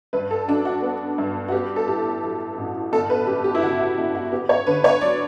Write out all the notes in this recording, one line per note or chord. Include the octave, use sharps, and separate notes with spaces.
G2 B4
A4
F#3 D4
F#4
B3
G2
F#4
B3 G4
A4
A2 G4
F#3
A1
G1 A4
B4
F#2 G4
G4
E4
C#3 F#4
F#4
G1
F#4
B3 G4
C#5
D3 B4
C#5
F#3 D5